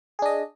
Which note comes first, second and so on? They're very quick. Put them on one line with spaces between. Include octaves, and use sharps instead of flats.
G#4 D4 D#5